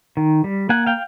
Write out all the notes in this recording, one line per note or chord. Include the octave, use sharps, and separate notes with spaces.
D#3
G3
A#3 F#5 G#5
F5 G5